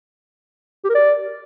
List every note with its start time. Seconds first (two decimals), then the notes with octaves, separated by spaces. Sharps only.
0.84 G4
0.90 A#4
0.95 D5